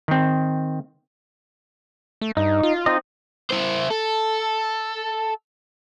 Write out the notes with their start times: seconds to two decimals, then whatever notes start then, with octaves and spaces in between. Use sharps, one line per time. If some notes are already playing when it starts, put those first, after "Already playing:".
0.08 D#3 C4
2.21 A3
2.37 G2 D#4
2.63 F4
2.86 C4 D#4 D#5
3.51 E4 C5
3.90 A4